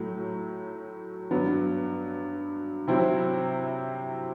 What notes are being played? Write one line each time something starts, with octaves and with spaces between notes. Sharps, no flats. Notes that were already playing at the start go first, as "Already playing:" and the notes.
Already playing: A2 F#3 A3
G2 F#3 B3
C3 F#3 C4 E4